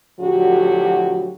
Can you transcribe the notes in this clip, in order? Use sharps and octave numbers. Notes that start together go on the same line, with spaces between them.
A2 D3 F3 F#3 F#4 G4